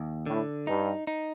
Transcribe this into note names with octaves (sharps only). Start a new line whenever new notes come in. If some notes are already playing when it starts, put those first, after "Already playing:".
Already playing: D#2
A2 D3
G2 D#4
D#4